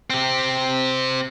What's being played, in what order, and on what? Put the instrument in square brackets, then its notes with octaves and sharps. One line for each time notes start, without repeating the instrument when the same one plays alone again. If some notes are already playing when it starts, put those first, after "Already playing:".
[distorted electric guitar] C4 G4